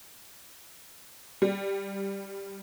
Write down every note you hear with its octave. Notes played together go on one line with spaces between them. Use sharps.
G3